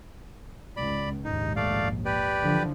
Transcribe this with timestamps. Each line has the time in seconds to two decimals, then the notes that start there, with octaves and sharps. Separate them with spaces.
0.77 G#1 C#2 D5 B5
1.24 A#1 D#2 G#2 D#4
1.56 A3 D5 F5
2.05 G4 B4 D5
2.42 D3 E3 F3